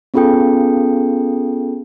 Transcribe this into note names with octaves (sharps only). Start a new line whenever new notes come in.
B3 C#4 F4 G#4 A4 G5